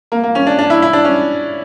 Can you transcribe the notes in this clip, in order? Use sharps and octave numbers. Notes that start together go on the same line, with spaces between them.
A#3
A#3
C#4
D4
D4
E4
E4
D4
C#4